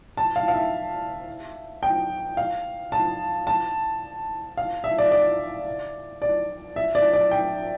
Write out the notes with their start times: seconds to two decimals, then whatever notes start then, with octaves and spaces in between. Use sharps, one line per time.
0.17 A5
0.36 F5
0.48 F5
0.54 E5
1.83 G5
2.37 F5
2.92 A5
3.47 A5
4.57 F5
4.84 E5
4.98 D5
5.12 D5
6.22 D5
6.76 E5
6.95 D5
7.13 D5
7.31 G5